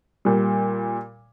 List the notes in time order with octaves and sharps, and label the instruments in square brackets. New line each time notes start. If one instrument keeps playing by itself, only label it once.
[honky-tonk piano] A#2 G3